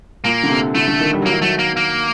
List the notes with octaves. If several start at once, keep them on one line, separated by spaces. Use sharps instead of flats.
A#2 A#3
D3
C3
D3 A3
D3
D#3
G3
F#3 A#3
D#3
F#3 A3
A#3
A#3